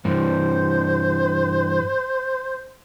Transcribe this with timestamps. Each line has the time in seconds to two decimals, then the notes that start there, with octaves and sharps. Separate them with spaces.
0.05 G2 E3 C5